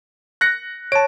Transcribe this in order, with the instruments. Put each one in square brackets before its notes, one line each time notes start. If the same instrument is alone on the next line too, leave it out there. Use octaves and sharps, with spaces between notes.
[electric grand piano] F#6 A#6 C#7
[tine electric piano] C#5 A5 [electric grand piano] D7